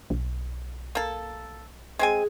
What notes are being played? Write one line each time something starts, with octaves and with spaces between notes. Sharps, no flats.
B1
A#3 A4
G#3 C4 G#4 G#5